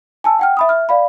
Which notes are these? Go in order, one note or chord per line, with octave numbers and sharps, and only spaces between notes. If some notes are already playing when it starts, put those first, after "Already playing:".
G#5 A5 E6
F#5 G5 F6
E5 B5 D#6
E5 F6
D5 F5 B5